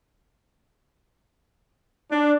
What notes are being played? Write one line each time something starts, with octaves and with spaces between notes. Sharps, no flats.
D4